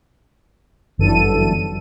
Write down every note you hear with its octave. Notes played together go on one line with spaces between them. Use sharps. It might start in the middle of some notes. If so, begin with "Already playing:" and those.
G1 F#2 D3 E3 A4 D#7